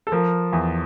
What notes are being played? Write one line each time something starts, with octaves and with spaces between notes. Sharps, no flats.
A4
F3 A#4
E2